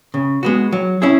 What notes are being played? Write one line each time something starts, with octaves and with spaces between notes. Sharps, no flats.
C#3
G#3 B3 F#4
F#3
C#4 E4 G#4